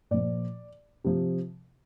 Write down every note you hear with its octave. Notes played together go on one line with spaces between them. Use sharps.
A#2 F3 D5
C3 F3